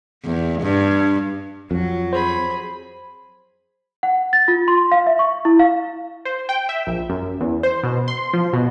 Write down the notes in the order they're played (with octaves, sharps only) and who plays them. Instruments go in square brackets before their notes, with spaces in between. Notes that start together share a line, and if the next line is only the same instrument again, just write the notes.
[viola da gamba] E2
G2
[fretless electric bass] F2 [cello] F#3
[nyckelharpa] G#4 B5 [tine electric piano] C5
[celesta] F#5
A6
F4
C6
F5
E5
C#6
E4
F5
[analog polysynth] C5
G5
E5
A#1
F#2
E2
C5
B2
C6
F3
B2